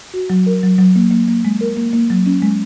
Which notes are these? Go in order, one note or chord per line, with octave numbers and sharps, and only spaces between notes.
F#4
F#3
A#4
F#3
F#3
A#3
A#3
A#3
G#3
A#4
A#3
A#3
F#3
C#4
G#3